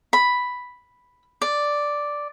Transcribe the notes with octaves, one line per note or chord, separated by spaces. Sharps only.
B5
D5